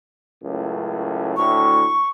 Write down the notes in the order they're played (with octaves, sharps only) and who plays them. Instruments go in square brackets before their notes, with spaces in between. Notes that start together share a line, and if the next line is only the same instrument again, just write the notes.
[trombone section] C#2 F#2 A2
[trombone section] D2 A2 [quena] C#6